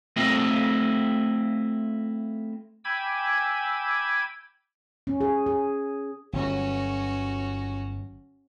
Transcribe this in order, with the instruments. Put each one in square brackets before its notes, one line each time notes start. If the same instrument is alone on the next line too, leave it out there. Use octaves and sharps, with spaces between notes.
[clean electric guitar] A3 C4 E4 F4 D#5
[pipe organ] G5 G#5 B5 D6 E6 G#6
[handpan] C#4
G#4
G#4
[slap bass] G1 F#3 [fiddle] C#4 F#4